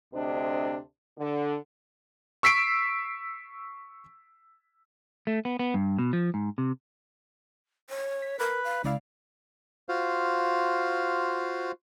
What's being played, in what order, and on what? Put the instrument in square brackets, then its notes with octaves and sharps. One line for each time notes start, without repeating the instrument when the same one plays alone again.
[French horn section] D2 C3 D4 C5 D#5
D3
[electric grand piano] C#6 E6 B6 C7 D7
[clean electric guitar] A3
B3
B3
G2
B2
F3
G#2
C3
[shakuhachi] C#5
[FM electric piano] B6
[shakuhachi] A#4 [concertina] B4
[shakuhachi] F5
[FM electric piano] C#2 D5 F5 [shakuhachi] E4
[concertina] F4 F#4 C5 F5